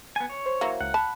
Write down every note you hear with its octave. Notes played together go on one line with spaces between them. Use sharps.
B3 G#5
C#5
C5
E3 F#3 A#3
C#2 F#5
A5 B5